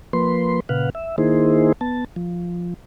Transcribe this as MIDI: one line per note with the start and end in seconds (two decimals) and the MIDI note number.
0.13 0.60 53
0.13 0.60 58
0.13 0.60 71
0.13 0.60 84
0.69 0.90 46
0.69 0.90 49
0.69 0.90 71
0.69 0.90 77
0.69 0.90 78
0.95 1.16 76
1.18 1.73 51
1.18 1.73 58
1.18 1.73 63
1.18 1.73 64
1.18 1.73 68
1.18 1.73 72
1.81 2.05 59
1.81 2.05 81
2.16 2.74 53